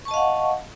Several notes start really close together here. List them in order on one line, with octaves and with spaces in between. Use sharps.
C#6 A5 D#5 F5 F#5